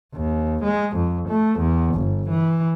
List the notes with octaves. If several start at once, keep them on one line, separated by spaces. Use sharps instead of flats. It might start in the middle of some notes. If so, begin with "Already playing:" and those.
D#2
G#3
F2
A3
E2
G1
E3